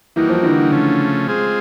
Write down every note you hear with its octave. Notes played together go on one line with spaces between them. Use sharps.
E3 G3 A#3 D#4 F#4
F3
D3 E3
C#3 F3 A3 C#4
G#3 C4 F4 G#4